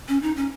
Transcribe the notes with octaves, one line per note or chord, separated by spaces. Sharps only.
C#4
D#4
C#4